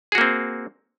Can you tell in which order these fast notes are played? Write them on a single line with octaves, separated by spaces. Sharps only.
G#4 F#4 A#3 C4